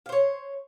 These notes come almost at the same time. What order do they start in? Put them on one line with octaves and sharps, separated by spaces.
F5 C5 C#5